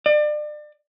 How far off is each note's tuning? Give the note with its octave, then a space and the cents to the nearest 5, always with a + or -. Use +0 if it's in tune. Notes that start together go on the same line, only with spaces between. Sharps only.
D5 +35